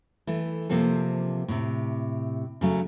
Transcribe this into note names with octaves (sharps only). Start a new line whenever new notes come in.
E3 A3
C3 F3 A#3 C4 A4
A2 C3
C#3 F#3 A3